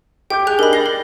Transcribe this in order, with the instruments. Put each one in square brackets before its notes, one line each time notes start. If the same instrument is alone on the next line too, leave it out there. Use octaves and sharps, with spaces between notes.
[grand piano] G4 D6 G6 [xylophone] G5
[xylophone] G#4 F#6 [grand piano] G5 G#5
[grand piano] D4 D#4 G4 [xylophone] A#4 B5
[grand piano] A6 A#6 C7 [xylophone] G7
[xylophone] A#4